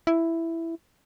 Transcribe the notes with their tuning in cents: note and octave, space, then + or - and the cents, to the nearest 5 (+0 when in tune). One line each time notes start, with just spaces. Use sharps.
E4 +5